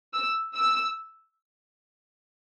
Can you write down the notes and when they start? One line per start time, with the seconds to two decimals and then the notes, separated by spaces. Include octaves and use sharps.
0.14 E6
0.56 E6